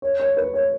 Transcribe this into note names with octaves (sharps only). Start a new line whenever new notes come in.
C#5
C#5
B4
C#5